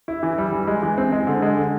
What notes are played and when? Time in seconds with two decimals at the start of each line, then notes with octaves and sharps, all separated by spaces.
0.08 E4
0.23 E3
0.38 G3
0.53 E3
0.67 G#3
0.83 E3
0.98 C4
1.12 G#3
1.27 D3
1.42 G#3
1.57 D3